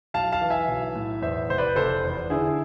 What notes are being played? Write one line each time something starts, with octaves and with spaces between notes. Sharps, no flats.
B1 F5 A5
F5 A5
E3
E5 G#5
B1
A2
E2 C5 E5
F1 C5
B4 D5
F1 A4 C5
E2
D3 E4 G#4